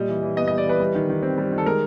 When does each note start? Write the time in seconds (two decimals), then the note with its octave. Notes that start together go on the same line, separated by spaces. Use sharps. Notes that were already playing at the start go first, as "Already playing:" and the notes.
Already playing: A#2 G3 D#5
0.09 E3
0.23 E3
0.37 B3 D#5
0.48 G3 D#5
0.58 D5
0.65 E3 B4
0.80 G3
0.95 D#3
1.09 D#3
1.23 C4
1.38 G3
1.52 D#3
1.58 A4
1.66 G#3 A#4